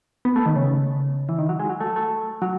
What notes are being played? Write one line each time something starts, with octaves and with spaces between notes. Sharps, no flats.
B3
A3
D#3
C#3
E3
D#3
F#3
G#3
F#3
A3
A3
F#3